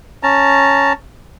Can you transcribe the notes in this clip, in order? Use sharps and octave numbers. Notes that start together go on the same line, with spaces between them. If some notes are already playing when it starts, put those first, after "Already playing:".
C#4 A5 A#5